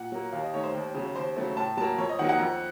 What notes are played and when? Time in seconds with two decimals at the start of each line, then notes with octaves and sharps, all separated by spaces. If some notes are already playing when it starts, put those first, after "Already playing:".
Already playing: A#2 F#5
0.12 F#3 A#3
0.33 D#2 F5
0.43 D#5
0.53 D#3 A3 C#5
0.63 C5
0.74 D#2
0.94 C#3 F#3
1.15 D#2 C5
1.36 C#3 F#3 A3
1.57 A2 A5
1.77 F#3 A#3 A5
1.98 F2 C#5
2.09 D#5
2.19 D#3 F#3 A#3 F#5
2.29 F#5
2.39 F2